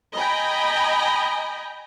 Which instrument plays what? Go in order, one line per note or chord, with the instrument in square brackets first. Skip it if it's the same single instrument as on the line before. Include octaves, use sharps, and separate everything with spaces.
[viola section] D#5 G5 G#5 A#5 B5